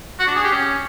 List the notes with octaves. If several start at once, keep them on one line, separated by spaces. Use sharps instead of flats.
F#4
D4
G#4
G4
C#4